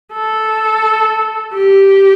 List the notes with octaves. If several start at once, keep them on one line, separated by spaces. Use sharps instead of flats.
A4
G4